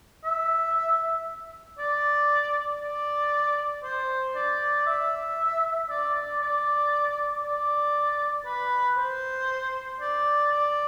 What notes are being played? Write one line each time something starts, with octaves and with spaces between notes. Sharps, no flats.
E5
D5
D5
C5
D5
E5
D5
D5
D5
D5
B4
C5
D5
D5